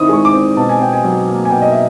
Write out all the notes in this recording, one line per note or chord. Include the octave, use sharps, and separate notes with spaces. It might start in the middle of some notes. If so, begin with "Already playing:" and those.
Already playing: D#3 C4 E4 D#6
G#3 C#6
D6
C4
B2 A5
G#5
B2 G5
G#5
F#3
A#3
G#5
B2 G5
D#5
E5